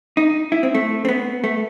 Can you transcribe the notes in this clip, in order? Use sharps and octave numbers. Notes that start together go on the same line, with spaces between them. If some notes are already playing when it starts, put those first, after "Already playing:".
D#4
E4
C4
A3
C4
B3
A3